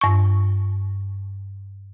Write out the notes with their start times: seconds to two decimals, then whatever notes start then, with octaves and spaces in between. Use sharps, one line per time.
0.01 G2 C#6